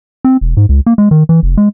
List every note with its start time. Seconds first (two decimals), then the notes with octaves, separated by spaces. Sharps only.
0.25 C4
0.41 E1
0.57 G#2
0.69 C#2
0.86 A#3
0.98 G#3
1.11 D#3
1.29 E3
1.43 F1
1.57 G#3